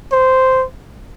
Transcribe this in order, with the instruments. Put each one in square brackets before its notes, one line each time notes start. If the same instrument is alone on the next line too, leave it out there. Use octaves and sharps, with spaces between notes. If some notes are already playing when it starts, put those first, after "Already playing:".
[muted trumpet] C5